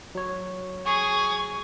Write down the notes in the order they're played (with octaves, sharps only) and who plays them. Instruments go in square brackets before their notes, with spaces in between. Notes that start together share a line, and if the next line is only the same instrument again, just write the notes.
[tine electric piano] F#3 C#5
[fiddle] G#4 [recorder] C#6